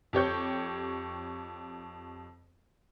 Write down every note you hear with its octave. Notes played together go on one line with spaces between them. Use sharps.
F2 G4 C#5 G6